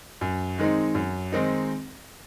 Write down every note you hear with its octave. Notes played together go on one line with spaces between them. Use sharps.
F#2
D#3 G#3 C4 D#4
F#2
D#3 G#3 C4 D#4